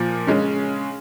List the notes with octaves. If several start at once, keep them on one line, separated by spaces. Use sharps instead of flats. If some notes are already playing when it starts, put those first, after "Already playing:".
Already playing: A#2 F3
C#3 G#3 C#4